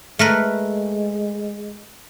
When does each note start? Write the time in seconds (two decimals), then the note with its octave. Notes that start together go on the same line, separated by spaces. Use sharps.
0.19 G#3 A3 A#4 B4